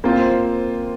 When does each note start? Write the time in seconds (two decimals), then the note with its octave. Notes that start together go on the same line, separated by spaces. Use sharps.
0.04 A#3 C4 F4 C5